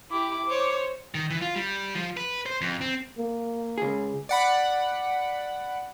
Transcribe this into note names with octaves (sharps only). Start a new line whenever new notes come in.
E4 G4 D6
C5 C#5
D#3
E3
F4
G3
F3
B4
C5
F2
C4
A#3
C#2 G#4
D5 F#5 B5